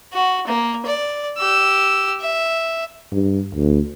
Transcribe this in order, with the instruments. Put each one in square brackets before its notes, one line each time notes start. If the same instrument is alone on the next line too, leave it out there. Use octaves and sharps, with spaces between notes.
[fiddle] F#4
A#3
D5
G4 E6
E5
[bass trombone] G2
D2